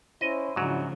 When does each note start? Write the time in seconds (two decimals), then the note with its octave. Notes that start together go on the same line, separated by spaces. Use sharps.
0.21 C#4 E4 C5 D#5
0.56 G#2 C#3 F3 F#3 D4 E4 F#4